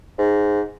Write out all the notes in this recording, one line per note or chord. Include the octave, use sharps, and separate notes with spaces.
G#2